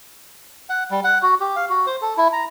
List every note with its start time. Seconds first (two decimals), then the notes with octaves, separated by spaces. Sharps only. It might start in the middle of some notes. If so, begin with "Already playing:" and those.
0.70 F#5
0.91 G3
1.04 F#5
1.22 F#4
1.40 G4
1.56 F5
1.69 F#4
1.87 C5
2.02 A4
2.17 E4
2.33 A#5